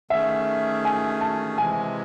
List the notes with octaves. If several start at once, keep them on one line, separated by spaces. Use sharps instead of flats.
D#3 A3 C#4 G#4 E5
G#5
A5
C3 E3 G#3 G#5